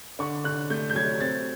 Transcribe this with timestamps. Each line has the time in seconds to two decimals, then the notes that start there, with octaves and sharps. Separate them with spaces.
0.19 D3 C#6
0.44 D3 F#6
0.70 A3 G6
0.90 G6
0.95 F#3 G#6
1.20 C4 A6